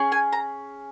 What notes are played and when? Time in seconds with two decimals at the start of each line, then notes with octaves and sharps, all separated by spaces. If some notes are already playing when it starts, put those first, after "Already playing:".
Already playing: C#4 G#4
0.12 G#5
0.33 A#5